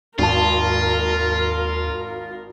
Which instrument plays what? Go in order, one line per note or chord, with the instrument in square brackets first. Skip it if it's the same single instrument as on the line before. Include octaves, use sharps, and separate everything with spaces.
[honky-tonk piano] G#1 A5 [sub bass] D#2 [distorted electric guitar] F4 [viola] A#4